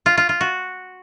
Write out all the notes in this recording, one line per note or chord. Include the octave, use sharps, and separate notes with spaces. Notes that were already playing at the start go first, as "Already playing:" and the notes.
F4
F4
F4
F#4